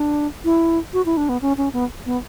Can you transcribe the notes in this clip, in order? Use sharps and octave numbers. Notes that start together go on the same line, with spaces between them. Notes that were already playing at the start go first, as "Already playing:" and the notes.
Already playing: D4
E4
F#4
E4
D4
B3
C#4
C#4
B3
B3